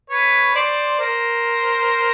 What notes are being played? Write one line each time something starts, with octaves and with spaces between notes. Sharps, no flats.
B4 C#5
C5 D5
A#4 C5